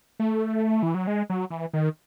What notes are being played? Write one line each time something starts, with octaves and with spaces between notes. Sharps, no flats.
A3
E3
F#3
G#3
F#3
E3
D#3